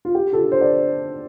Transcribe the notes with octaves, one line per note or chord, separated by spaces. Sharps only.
F4
G4
F4 A4
C5
D5